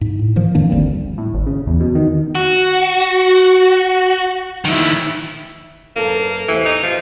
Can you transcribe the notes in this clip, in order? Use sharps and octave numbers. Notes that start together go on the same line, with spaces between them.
G#2
A2
D#3 F3
F2 D#3 A#3 D4
G1 D2 G3 C4
A2
G#1
C#3
E2
B2
D#3
F#4
D#3 E4
F#2 A#3 A4 B4
E2 E3 G4 C5
D#4
F3 G4